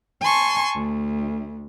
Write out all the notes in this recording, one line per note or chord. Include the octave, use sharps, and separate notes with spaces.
G#5 A5 C6 C#6
D2